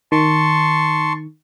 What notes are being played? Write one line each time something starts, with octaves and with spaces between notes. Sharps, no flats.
D#3 A5 C6 C#6